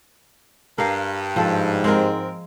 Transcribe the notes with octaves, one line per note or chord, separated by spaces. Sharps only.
G2 A#4 F5
G#2 F3 A4
G#3 C4 A#4